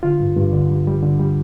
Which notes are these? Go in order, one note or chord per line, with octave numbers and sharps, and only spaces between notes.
D3 F4
G2
G2
D3
G3
G3
D3
G3